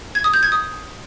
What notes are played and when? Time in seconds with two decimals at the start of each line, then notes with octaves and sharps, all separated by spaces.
0.15 G#6
0.24 D#6
0.34 G6
0.43 G#6
0.52 D#6